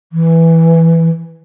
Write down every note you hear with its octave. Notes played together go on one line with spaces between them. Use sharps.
E3